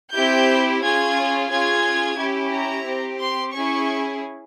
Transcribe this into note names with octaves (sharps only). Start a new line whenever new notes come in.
C4 E4 G4 G6
C#4 F4 G#4 G#6
C#4 F4 G#4 G#6
C#4 E4 G4
A#5
C4 G4
C6
C#4 E4 G#4 C#6